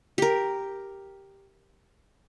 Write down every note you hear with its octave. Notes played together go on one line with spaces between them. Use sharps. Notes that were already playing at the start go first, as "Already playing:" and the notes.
G4 A#4